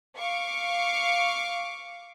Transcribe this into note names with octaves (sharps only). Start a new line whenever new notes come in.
F5 C#6 D6